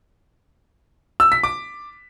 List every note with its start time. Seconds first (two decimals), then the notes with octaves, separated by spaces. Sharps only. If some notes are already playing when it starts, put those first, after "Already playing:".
1.20 E6
1.32 B6
1.43 D6